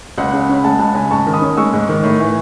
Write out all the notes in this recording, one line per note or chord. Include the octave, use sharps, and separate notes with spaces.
C#2 F#5
C#3
C#4
B5
G#3 F#5 A5
C#2 F#5 A5
C#3 G#5 B5
G#2 A5 C#6
D#3
B5 D#6
C#4
G#3 C#6 E6
G#2
D#3
A2
E3